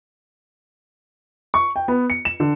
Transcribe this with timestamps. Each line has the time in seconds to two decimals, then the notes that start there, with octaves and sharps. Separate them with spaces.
1.54 C#6
1.76 G5
1.88 B3
2.10 C#7
2.25 E7
2.40 D3